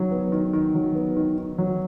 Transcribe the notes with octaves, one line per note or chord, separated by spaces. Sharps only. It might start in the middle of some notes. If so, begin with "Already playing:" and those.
Already playing: D#3 F#3
B3
D#3
D#3
F#3
B3
D#3
D#3
F#3